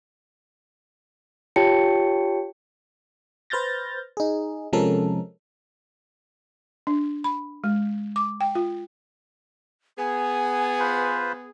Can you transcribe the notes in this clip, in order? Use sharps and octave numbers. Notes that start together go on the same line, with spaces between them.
F4 G4 C#5 G5 A5 C#7
B4 C5 F6 G6 A6 A#6
D#4 G#4
C3 F3 G#3 C#4 A4 A#4
D4
B5
G#3
D6
G5
F4
B3 G#4 G#5
F4 B4 C5